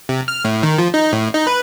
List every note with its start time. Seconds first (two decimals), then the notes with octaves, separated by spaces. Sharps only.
0.09 C3
0.28 F6
0.45 A2
0.63 D#3
0.78 F3
0.94 D#4
1.13 A2
1.34 D#4
1.47 B4